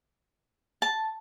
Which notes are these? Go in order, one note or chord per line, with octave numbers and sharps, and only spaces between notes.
A5